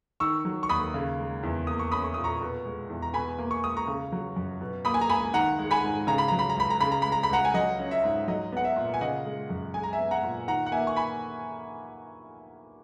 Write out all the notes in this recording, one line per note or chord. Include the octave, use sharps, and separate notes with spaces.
D#3 C#6 E6
F#3
C#6
D#2 B5 D#6
C#3
G#3
E2
A#3 D#6
C#6
C#4 B5 D#6
C#6
A#2 D#6
A#5 C#6
B2
G#3
E2
A#5
B2 G#5 B5
A#3
C#6
C#2 D#6
A#5 C#6
C#3
F#3
F#2
B2
A#3 B5 D#6
G#5
A#5
C#2 G#5 B5
D#3 F#5 A#5
G#3
G#5 B5
G#2
C#3 A#5
B5
F#3 A#5
B5
A#5
C#2 B5
A#5
C#3 B5
A#5
G#3 B5
A#5
B5
C#2 F#5 A#5
G#5
F#3 D#5 F#5
C#4
E5
G#2
F#3 D#5
B3 F#5
E5
A#2
G#5
C#3 D#5 F#5
G#3
F#2
G#3 G#5
A#5
E5 G#5
B3
F#5 A#5
A#2
D#3 F#5 A#5
F#5
A#3 E5 G#5
C#6
G#5 B5